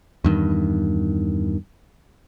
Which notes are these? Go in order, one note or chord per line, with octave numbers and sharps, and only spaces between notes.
E2 G2 D#3